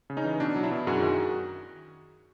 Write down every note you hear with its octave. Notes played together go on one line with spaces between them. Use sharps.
C#3
C#4 D#4
E3
B2 D4
F#3
D4 E4
B2
F#2 F#4 G#4
D#3